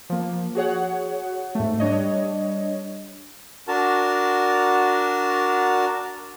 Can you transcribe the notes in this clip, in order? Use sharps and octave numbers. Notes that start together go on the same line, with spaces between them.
F3 A#3
F#4 G#4 C#5 F#5
G#2 A3
G3 D4 C#5 D#5
D4 F#4 A#4 A5